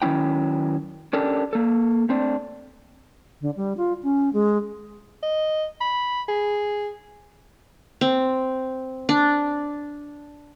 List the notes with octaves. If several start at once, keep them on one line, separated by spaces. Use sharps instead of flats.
D#3 F#3 C#4 E4 G5
C#4 D4 G4 A4 A#4
A#3 A4
A3 C4 D4
D3
G3
F4
C#4
G#3
D#5
B5
G#4
C4
D4